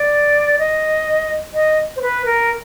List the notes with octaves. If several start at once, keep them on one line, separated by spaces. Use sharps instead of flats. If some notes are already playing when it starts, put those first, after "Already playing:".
Already playing: D5
D#5
D#5
C5
B4
A#4